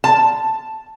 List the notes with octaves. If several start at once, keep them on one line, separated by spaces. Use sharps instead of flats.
A5